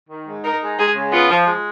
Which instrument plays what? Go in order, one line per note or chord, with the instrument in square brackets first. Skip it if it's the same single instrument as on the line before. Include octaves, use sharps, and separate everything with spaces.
[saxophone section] D#3
G#2
[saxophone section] D#4 [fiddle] A#4
[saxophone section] G#3
[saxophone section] G#3 [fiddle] G#4
[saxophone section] C#3
[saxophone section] B3 [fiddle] F4
[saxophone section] F3
G#3